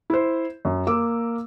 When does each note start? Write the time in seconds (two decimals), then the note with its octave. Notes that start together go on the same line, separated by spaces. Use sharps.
0.10 E4 C5
0.65 F#2
0.87 A#3 A#4 D6 E6